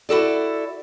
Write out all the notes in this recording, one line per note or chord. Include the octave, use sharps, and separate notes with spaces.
E4 F#4 A4 D5